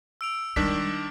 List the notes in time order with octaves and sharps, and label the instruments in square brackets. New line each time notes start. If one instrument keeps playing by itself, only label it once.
[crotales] E6 D7 F7
[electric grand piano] D#3 D4 B6 [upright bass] G3 G#3 [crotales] D6 E6